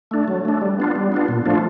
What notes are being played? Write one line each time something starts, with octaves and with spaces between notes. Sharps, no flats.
A3 D4
F#3
A3 D4
G3
B3 D4 F4
G3
B3 D4 F4
A#2
F3 A3 D4 F4